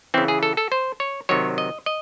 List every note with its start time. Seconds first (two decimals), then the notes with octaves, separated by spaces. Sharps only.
0.14 C#3 E3 C4
0.28 G#4
0.43 A4
0.57 A4
0.72 C5
1.00 C#5
1.29 C3 D#3 F#3 C#5
1.58 D#5
1.86 D#5